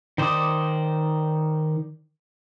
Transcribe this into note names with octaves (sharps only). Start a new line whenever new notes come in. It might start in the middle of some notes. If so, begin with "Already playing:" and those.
D#3 C5 D5 D6 D#6